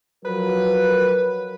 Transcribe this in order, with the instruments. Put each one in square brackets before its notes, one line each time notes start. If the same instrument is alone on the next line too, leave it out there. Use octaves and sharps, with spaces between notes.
[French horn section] F3 F#3 A#4 [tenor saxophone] B4